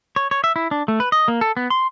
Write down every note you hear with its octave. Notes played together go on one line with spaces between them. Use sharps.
C#5
C#5
E5
E4
D4
A3
B4
D#5
A#3
A4
B3
C6